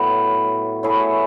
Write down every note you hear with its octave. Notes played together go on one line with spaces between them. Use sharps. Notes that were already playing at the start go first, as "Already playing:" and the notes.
Already playing: A2 F#3 B3
A3 E4 G#4 C#5